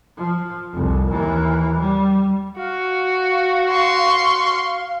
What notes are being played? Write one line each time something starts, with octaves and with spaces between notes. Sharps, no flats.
F3
F1 C2
D#2 E3
G3
F#4 F5
C6 C#6